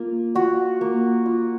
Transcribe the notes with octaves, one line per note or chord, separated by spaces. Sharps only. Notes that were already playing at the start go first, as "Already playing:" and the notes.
Already playing: A#3 F4
F4 F#4
A#3
F4